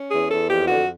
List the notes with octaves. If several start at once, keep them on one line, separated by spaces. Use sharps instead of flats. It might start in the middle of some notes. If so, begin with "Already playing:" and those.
Already playing: C#4
E2 G#4
E2 A4
F2 G4
D3 F#4